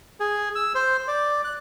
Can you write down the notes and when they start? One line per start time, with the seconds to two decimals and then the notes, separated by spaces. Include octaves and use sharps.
0.20 G#4
0.55 E6
0.75 C5
1.08 D5
1.44 F#6